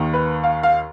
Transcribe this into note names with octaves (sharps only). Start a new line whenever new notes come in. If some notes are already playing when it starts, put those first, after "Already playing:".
Already playing: D#2 D#3
B4
F5
F5